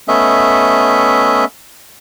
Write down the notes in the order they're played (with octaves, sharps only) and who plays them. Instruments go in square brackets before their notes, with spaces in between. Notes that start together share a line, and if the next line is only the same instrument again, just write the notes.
[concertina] A3 B3 C#4 D#5 E5